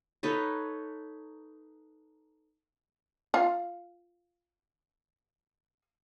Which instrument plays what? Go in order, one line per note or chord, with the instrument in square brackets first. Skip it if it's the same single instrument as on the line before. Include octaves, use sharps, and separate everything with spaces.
[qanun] D#4 A4 B4 C#5
[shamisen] F4 F5